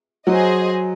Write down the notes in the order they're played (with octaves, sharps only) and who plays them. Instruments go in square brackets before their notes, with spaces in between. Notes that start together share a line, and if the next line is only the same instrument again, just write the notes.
[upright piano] F#3 [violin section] G#4 C5 D#5